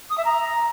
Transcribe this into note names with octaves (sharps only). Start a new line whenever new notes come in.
D#6
E5
A#5